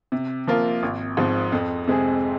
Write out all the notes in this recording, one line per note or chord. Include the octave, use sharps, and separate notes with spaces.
C3
F3 A#3 F4 A#4
G#1
G#2 F3 C4
F2
C3 G#3 C4 G#4